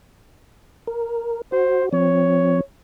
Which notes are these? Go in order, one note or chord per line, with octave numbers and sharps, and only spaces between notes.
A#4
F#4 C5
F3 C4 C#5